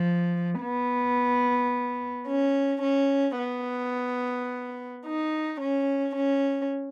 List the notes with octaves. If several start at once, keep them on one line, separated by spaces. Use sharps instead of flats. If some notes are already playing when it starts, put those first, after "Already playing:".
Already playing: F3
B3
C#4
C#4
B3
D#4
C#4
C#4